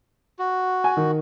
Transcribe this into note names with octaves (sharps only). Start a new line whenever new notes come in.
F#4
G#5
D#3